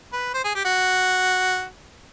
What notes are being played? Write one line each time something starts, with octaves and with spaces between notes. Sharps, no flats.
B4
C5
G#4
G4
F#4